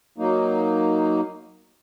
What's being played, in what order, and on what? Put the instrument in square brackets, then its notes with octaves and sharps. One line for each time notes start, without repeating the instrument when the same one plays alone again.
[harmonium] F#3 A#3 D#4